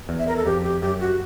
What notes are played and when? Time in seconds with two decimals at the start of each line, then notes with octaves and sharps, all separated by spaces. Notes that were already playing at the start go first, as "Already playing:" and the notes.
0.09 E2
0.18 E5
0.27 A#4
0.36 A4
0.45 F2 G4
0.64 G4
0.81 F#2 G4
1.00 F#4